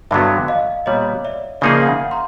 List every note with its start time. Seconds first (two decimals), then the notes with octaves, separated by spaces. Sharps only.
0.11 G2 D3 F#3 B3 D5 E5
0.48 D#5 F5
0.86 A#2 G3 B3 C#5 D#5
1.25 D5 E5
1.61 C#3 F3 A#3 D#4 G#4 D5 E5
1.82 F5
1.86 E5 F#5
2.11 A#5 C6